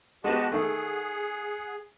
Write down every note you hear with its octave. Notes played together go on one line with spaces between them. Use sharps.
G#3 B3 F#4 G4 D#5 F#5 A5
D#3 A3 G#4 F#5